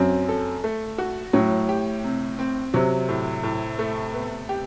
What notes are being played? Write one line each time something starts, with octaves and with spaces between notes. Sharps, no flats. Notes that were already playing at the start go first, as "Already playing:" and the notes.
Already playing: F#2 C4
A4
A3
F#4
A2 F#3
G4
C3
C4
C3 F#3
A2
A2
A3
B3
G4